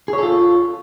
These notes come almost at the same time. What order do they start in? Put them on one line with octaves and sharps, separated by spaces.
G#4 C#5 A4 F4